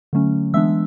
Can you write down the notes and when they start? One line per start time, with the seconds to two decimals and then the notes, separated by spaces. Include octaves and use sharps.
0.13 D3 F#3 A3 C#4
0.54 E3 G#3 B3 D4 E5 E6